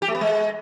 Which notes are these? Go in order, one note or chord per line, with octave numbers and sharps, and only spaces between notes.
G4
A3
B3
G#3